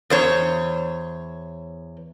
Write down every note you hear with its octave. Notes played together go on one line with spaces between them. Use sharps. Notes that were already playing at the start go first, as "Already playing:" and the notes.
E2 C5 C#5